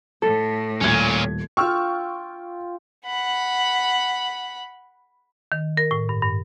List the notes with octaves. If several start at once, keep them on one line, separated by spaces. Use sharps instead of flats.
A2 A4
D#1 A#2 C#4 G#6
F4 G5 C#6 E6 F6
F#5 B5
D#3
A#4
A2
G2
G2